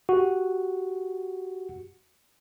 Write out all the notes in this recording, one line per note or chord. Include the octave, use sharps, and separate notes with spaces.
F#4 G4